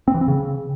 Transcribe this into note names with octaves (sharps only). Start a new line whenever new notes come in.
C4
E3
C4
C#3